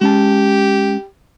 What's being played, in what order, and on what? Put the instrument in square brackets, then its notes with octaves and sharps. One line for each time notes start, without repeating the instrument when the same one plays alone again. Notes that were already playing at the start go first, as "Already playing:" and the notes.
[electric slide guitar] G#3 C#4 A5 [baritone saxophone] G4